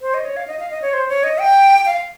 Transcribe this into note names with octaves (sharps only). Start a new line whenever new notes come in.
C5
D#5
C#5
F5
D#5
F5
D#5
C#5
C5
C#5
D#5
G5
F5